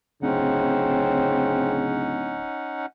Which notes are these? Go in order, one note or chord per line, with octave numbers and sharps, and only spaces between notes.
D1 C#3 C4 C#4 D#4 F#5